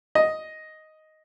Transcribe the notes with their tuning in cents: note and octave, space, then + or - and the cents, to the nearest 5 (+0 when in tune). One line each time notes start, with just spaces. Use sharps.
D#5 +5